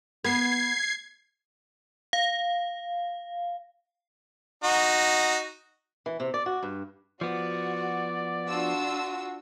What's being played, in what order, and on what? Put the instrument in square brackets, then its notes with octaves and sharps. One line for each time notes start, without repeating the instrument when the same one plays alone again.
[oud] B3 [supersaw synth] G#6 C7
[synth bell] F5
[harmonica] D#4 F#4
[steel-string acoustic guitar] E3
C3
D5
F#4
G2
[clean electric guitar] F3 B3 [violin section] F#4 [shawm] D5
[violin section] D4 F4 E6 [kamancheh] F#4